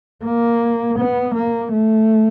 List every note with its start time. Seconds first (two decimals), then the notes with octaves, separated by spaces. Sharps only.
0.25 A#3
0.99 B3
1.35 A#3
1.72 A3